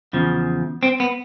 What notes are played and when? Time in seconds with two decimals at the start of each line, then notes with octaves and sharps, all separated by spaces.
0.13 E2 C#3 F3
0.83 C4
1.00 B3